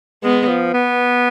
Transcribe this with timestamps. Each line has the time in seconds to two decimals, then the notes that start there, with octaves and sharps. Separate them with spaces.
0.23 G#3 B3
0.48 F3
0.74 B3